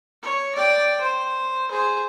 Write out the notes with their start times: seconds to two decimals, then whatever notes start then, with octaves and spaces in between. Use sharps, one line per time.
0.23 C#5
0.55 D5 G5
1.00 C5
1.71 G#4 C5